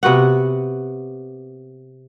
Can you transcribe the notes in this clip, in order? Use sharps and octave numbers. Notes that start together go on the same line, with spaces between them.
C3 B3 F#4 F#5